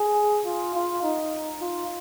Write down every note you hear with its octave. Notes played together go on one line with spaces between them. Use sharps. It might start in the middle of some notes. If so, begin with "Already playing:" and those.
Already playing: G#4
F4
F4
D#4
F4